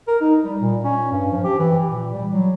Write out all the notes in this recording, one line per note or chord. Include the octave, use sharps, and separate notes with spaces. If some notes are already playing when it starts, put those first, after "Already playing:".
A#4
D#4
G3
A#2
C#4
G2
F3
G4
E3
A#2
G3
F#3